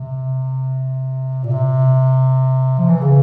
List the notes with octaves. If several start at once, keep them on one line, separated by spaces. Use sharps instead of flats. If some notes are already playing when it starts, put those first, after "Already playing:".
Already playing: C3
A#2
C3
F3
E3
C#3